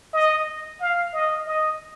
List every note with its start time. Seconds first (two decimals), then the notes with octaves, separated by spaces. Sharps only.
0.14 D#5
0.81 F5
1.13 D#5
1.46 D#5